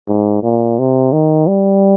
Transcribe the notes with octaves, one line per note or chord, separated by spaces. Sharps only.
G#2
A#2
C3
D#3
G3